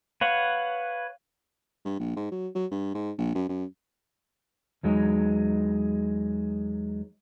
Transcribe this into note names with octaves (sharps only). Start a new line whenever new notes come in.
B4 C#5 F5 F#5
G2
A#1
G#2
F#3
F#3
G2
G#2
A#1
F#2
F#2
E2 F#3 G#3 D#4